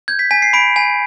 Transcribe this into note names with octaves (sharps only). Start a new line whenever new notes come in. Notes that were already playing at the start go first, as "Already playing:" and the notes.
G6 G#6
B6
G#5 B6
C7
B5 D7
G#5